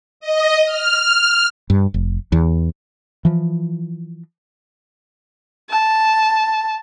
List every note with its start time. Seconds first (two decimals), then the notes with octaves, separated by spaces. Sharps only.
0.20 D#5
0.65 F6
1.70 G2
1.94 F1
2.32 E2
3.25 E3 F3
5.70 A5